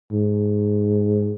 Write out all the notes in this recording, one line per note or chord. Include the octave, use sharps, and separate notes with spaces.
G#2